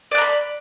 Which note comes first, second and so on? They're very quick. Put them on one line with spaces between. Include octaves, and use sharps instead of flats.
D5 F#6 A#5 B5